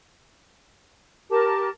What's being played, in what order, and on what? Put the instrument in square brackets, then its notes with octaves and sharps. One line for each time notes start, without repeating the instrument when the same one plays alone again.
[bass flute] G4 [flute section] A#4 A5